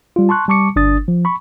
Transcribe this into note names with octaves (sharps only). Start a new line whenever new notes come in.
G3 F4
A5 C6 C#6 F#6
G3 A5 C#6 D6 C#7
G1 D4 D#6 A6
F3
B5 C#6